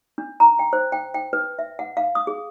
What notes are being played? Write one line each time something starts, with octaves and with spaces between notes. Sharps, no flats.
D4
A#5
G5
C5
G5
G5
B4
E5
F#5
F5
D#6
G#4